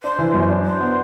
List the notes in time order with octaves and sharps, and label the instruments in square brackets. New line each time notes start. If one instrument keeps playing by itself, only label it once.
[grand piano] D4 [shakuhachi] C5
[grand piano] E3
F#2
D4
[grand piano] D4 [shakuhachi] C5
[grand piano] B3